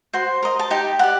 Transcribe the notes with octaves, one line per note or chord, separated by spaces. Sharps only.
F#4 C5 C6
A#4 D#5
A5
D#4 G4 G5
G4 D5 F#5